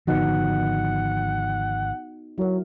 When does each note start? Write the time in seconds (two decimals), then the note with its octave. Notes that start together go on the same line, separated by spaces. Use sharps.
0.07 G#1 D3 F3 B3 D#4 F#4 F#5
2.38 F#3 E4 A#4